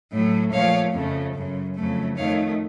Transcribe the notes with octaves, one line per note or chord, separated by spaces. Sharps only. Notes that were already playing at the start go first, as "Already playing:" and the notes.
A2 F#3 A3
A#2 F3 A3 C#5 F5
F2 C#3 F3 A3
F#2 C#3 F#3
F2 C#3 F#3 A3
F2 D#3 A3 C#5 F5